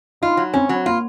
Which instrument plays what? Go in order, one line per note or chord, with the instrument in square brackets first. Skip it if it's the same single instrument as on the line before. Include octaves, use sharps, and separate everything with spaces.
[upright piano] D#4 [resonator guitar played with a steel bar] F4
[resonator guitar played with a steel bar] F#3
[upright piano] C4 [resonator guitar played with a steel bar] C#4
[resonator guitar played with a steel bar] F#3
[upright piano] A#3 [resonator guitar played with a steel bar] F4